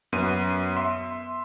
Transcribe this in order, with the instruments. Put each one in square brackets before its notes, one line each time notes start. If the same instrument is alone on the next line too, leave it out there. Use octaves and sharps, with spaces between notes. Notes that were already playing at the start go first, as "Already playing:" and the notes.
[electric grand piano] F#2 B3 D#7
E5 C6